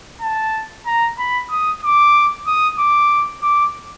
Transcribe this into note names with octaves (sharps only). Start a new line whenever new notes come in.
A5
A#5
B5
D#6
D6
D#6
D6
D6